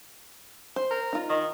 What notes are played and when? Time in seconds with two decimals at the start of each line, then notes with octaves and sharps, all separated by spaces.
0.76 C5
0.91 A#4
1.13 D#4 F4
1.29 D#3